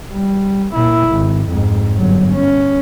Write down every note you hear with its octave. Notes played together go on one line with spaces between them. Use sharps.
G3
A#2 E4
G#1
F2 G#2
G1 F#3
C#4